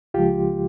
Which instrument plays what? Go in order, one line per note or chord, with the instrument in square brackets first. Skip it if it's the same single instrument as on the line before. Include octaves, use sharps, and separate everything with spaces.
[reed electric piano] C#2 C#3 F3 G#3 F4 G4